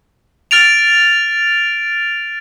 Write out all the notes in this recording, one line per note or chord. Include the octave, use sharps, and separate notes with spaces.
F6 A6 D7 F7